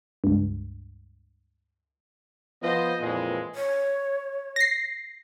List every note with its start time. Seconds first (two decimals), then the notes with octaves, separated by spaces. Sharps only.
0.24 C#2 G2
2.63 F3 B3 C5 D#5
3.01 F2 A#2 E3 G#3
3.55 C#5
4.56 A#6 C7